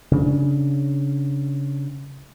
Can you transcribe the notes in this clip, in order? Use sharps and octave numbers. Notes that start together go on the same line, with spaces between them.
C#3 D4